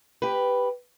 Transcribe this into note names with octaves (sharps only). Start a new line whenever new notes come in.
G4 B4